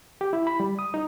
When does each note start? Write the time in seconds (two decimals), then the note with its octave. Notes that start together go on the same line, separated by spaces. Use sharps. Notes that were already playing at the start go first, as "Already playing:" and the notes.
0.21 G4
0.33 E4
0.47 B5
0.60 G3
0.79 D#6
0.94 D#4